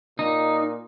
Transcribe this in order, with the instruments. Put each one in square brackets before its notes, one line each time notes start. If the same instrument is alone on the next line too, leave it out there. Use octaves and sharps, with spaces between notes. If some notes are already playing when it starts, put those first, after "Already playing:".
[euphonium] A#2 [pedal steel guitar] D#4